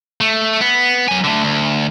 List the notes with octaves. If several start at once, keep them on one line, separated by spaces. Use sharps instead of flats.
A3
B3
F#3 G#5
D3 A3
D2